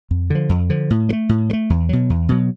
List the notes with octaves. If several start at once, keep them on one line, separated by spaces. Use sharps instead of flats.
F2
D3 F3
F2
D3 F3
A2
F#3
A3
A2
F#3
A3
E2
B2 F#3
E2
B2 F#3